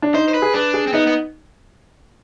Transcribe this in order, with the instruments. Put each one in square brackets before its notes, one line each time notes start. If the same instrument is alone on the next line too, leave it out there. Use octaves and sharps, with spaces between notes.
[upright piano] D4
[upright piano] D#4 [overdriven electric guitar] C5
[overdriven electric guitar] C5
B4
[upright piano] G#4
[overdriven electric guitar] D4 [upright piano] B4
[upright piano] G#4
[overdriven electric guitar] C4
[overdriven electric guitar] B3 [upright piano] D#4
[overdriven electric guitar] B3